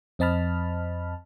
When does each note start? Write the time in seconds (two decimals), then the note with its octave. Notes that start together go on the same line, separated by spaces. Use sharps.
0.19 F2 C4 D#5 A5 B5 F6